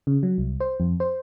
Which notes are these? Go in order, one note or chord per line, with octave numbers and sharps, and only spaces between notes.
C#3
F#3
C2
C5
F2
C5